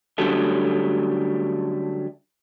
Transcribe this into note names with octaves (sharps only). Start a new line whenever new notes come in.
D3 F#3 G3 A3 C#4